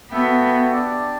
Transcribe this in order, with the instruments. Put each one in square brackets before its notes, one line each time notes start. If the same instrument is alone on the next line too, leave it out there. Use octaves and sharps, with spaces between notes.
[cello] B3 [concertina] F#4 A4 E5 G5
[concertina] D4 G4 D5